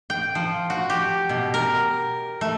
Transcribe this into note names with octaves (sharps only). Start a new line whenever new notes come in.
G5
F3
F#4
G4
B2
A#4
A3